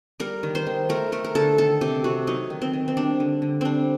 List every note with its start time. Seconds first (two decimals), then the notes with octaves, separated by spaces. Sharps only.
0.20 G3 A#4
0.43 D#3
0.55 C5
0.67 D#3
0.89 A3 A#4
1.12 A3 A#4
1.24 A#4
1.35 D3 A4
1.58 D#3 A4
1.81 C3 G4
2.04 C3 F#4
2.27 F#3 D#4
2.50 D#3
2.62 C4
2.73 D#3
2.88 C4
2.97 G3 D4
3.20 D3
3.42 D3
3.61 G3 C4 D4